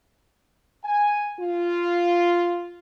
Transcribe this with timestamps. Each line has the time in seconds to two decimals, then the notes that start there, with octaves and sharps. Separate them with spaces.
0.84 G#5
1.38 F4